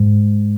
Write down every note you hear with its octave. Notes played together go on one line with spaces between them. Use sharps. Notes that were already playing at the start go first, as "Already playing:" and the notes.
Already playing: G#2